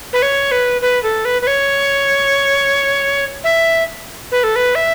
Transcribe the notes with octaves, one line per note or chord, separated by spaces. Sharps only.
B4
C#5
B4
B4
A4
B4
B4
C#5
E5
B4
A4
B4
E5